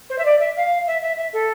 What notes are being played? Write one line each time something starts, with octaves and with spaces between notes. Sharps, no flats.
C5
E5
D5
E5
F5
E5
E5
E5
A4